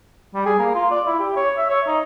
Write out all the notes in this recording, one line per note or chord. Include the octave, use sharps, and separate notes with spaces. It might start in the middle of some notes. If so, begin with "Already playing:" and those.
G3
G#4
A#3
F4
D5
E4
G4
C#5
E5
C#5
D#4